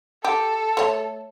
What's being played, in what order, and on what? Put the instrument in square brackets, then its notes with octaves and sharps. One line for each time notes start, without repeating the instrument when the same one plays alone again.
[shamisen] G4 [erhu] A4
[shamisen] A3 C#5